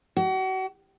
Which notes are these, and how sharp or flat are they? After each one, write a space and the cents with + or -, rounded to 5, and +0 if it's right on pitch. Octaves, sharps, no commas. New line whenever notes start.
F#4 +35